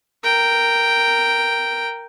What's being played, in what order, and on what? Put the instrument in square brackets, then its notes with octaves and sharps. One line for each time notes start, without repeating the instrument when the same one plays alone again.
[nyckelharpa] A#4 G5